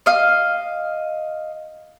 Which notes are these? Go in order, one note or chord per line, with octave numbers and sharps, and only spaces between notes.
D#5 F5